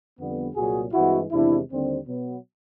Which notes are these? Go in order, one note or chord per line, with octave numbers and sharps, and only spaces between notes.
F2 D3 G3 B3
C2 A#2 F#3 F#4 G#4
G2 E3 G#3 C4 E4 F#4
E2 C3 D#3 G#3 D4 E4
D#2 D3 G3 C4
B2 F#3 B3